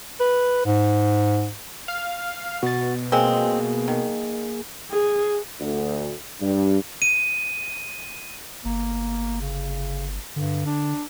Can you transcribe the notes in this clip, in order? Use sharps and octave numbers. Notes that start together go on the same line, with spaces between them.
B4
G#2
F5
B2 F#4 A6
G#3 A#3 C4 G#4
D#3
G#4
D2
G2
D#7
G1 A#3
C#3
G2 D3
D4